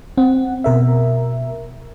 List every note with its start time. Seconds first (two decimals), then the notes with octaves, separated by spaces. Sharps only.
0.17 C4 F#5
0.64 B2 A#4 E5